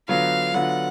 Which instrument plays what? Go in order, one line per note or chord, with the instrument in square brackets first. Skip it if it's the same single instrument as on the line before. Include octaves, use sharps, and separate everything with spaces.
[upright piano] D3 F#3 B3 F4 [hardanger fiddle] F5
[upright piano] D3 F#3 B3 F4 [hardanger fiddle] F#5